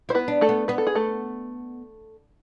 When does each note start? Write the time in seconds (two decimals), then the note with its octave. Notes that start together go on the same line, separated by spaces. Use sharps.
0.09 E4 C5
0.15 B3 B4
0.28 D4
0.41 A3 A4
0.49 B3
0.68 B3 B4
0.78 A4
0.87 G#4
0.95 A3 A4